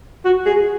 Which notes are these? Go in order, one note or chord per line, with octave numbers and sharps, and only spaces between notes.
F#4
G#4